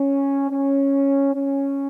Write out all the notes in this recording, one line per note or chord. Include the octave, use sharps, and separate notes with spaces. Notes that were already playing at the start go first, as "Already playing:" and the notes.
Already playing: C#4
C#4
C#4